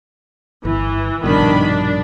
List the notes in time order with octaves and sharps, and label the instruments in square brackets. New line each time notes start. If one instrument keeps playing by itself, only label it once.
[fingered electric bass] G1 [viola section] E3
[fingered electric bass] A#1 G2 B2 [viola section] D#3 D4 B5
[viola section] D4